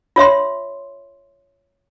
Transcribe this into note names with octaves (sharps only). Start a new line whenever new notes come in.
F4 C#5 E5 C6